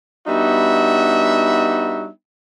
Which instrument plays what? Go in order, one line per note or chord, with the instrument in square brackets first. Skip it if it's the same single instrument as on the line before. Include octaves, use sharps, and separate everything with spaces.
[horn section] G3 B3 D4 D#4 F#4 E5